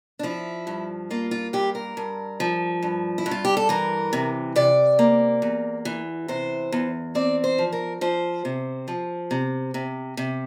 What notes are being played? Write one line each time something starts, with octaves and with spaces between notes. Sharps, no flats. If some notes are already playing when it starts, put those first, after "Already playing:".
D4
F3 E4
G2
A#3 F4
F4
G2 G4
A#4
G2
F3
G2
E4
G2
F4
G4
A4
E3 A#4
C3
C3 D5
A#3
E2
E3
C3 C5
E2
C4 D5
C5
F3
A#4
F3 C5
C3
F3
C3
C3
C3